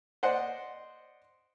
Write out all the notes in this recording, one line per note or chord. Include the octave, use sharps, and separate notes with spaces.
C5 D5 D#5 F#5